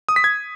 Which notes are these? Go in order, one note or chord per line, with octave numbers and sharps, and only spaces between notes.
D#6
B6
G#6